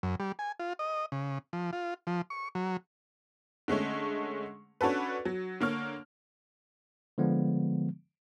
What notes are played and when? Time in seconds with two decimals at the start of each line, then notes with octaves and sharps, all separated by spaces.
0.03 F#2
0.20 G3
0.39 G#5
0.60 F4
0.79 D#5
1.12 C#3
1.53 F3
1.73 F4
2.07 F3
2.30 C#6
2.55 F#3
3.68 D3 G#3 A3 C#4
4.81 C#4 D4 F#4 A4 B4
5.25 F#3
5.61 D3 A#3 C#5 F6
7.18 D3 F3 G#3 B3